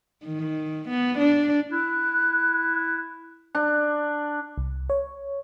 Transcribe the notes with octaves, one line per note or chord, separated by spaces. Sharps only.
D#3
B3
D4
E4 F#6
D4
C2
C#5